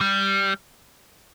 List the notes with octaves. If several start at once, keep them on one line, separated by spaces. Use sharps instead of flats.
G3